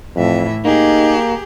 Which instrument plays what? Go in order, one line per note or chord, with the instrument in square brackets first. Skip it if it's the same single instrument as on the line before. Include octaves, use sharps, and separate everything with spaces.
[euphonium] F2 [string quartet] A2 E3 E5
[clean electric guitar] A#3 [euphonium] D#4 [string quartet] G4 G#4